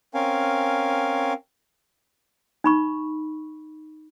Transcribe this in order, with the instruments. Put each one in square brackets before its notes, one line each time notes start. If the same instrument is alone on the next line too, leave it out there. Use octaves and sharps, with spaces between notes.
[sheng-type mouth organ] C4 C#4 A#4 F5 G#5
[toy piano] D#4 B5 C#6